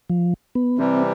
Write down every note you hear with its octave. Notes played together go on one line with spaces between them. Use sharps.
F3
B3
C3 E3 G3 C4